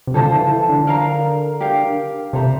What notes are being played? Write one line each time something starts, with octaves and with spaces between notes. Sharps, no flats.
C3
D3 A4 C5 F5 A5
E3
E3
D3
A#4 F5 A#5
G4 A#4 F5
C3 A4 C5 E5 A#5